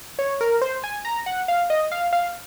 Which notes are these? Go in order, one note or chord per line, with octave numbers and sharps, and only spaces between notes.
C#5
A#4
C5
G#5
A#5
F#5
F5
D#5
F5
F5